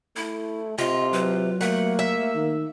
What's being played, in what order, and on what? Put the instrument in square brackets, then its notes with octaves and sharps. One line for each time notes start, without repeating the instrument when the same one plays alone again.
[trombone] A3 [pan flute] E4
[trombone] C3 [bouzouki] F4 [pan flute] D#5
[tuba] F#3 [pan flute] B4
[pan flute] A3 [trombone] A#3 [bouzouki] F#5
[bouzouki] E5
[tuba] D#3